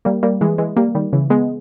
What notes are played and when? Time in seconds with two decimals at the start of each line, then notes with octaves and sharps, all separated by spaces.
0.05 G3 A#3
0.23 G3 A#3
0.41 E3 G#3
0.58 E3 G#3
0.77 G3 A#3
0.95 D#3 G3
1.13 C#3 E3
1.30 G#3 B3